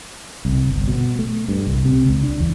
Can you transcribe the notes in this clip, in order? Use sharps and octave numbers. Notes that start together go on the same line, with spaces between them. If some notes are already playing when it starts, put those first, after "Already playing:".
C2
G1
B2
A3
G2
C2
C3
C#2
D4
E2